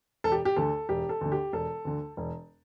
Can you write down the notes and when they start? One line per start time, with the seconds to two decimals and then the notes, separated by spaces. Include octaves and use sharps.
0.24 E1 A4
0.32 G4
0.45 G4
0.56 D2 D3 A4
0.89 E1 G4
1.09 A4
1.21 D2 D3
1.32 G4
1.53 E1 A4
1.85 D2 D3
2.17 E1